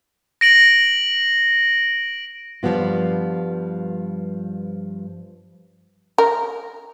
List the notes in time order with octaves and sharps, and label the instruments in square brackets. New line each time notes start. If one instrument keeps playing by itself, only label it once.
[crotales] A#6 D7 F#7
[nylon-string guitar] G2 F3 G3 B3 F4
[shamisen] A#4